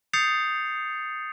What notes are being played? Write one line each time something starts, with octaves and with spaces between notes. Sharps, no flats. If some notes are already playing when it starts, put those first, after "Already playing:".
D#6 G6 A6 C7 C#7 F7